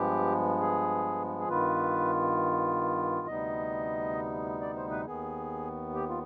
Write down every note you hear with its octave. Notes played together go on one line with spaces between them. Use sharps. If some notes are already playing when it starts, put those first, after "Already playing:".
Already playing: G2 F3 G#3 B3 G4
G#4
G#4
G2 D#3 B3 F4 B4
D2 C3 G3 B3 D#4 D#5
D5
C5
B4
D#2 D#3 B3 G#4
G4
F4